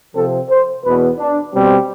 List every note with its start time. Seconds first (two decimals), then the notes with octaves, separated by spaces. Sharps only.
0.15 C3 F3 C4 A4
0.50 C5
0.84 E2 B2 B3 B4
1.18 D4
1.53 B2 G3 C4